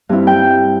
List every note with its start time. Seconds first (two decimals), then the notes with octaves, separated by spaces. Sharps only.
0.09 G2 G3 C4 E4
0.27 G5